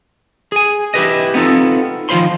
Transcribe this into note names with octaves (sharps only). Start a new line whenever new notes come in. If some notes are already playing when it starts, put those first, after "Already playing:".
G#4 G#5
E4 G4 B4 D#5
B3 C4 D#4 F4 A4
D#3 F3 F4 C5 B5 C6